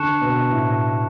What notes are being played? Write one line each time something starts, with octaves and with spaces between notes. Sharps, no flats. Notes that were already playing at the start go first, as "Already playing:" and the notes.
Already playing: D3 A5 C#6 F#6 C#7 E7
B2
A2